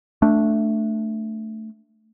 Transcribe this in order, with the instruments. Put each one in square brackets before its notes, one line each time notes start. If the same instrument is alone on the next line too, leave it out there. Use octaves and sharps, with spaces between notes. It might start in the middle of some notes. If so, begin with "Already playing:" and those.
[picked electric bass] A3 D4